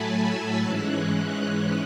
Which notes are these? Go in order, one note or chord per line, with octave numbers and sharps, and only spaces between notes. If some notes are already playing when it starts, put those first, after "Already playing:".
Already playing: A2 F#3 A3 G#5 A5 B5
E6
G#2 E3 G#3 C#4 F#6